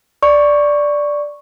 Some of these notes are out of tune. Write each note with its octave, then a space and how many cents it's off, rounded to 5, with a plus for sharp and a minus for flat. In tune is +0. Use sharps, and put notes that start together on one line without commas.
D5 +0 C#6 +0